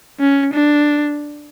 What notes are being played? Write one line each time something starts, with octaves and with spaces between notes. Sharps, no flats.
C#4
D4